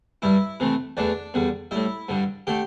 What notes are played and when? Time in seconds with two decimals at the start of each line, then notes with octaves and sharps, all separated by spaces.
0.22 G2 G3 E4 E5
0.60 C3 E3 A3
0.97 E2 E3 A3 D4 D5
1.34 E2 D3 G3
1.71 A2 G3 E4 E5
2.08 G2 D3 G3
2.47 D3 A3 G4 G5